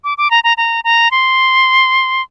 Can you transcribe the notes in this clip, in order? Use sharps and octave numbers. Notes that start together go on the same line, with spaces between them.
D6
D6
A#5
A#5
A#5
A#5
C6